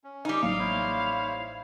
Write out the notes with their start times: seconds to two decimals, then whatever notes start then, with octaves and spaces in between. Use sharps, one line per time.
0.04 C#4
0.25 G3 D#4
0.43 A1 F#3 A#3 F5
0.59 E4 C5 C#5